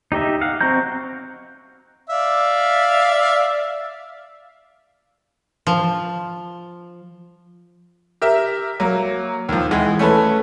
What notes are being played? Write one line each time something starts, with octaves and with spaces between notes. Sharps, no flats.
D#4 G4 D#5 E5
F5 F#5
C4 F#4 D#5 A#5 G6
D5 E5 F5
F3
G4 A#4 E5
F#3 A#3
D#2 F3
E3 G#3 F#5
A3 C#4 A4 B4